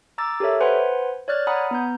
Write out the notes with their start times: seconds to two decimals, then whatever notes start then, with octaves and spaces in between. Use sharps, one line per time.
0.18 A#5 D6 E6 A6
0.40 G4 A4 A#4 C#5 E5
0.61 B4 C5 F#5 G#5 B5 C6
1.28 C#5 D5 F6 F#6 A6
1.47 F#5 G#5 A#5 B5 D#6
1.71 B3 A#5 G6